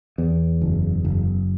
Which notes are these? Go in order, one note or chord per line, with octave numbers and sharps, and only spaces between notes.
E2
F#1
F#1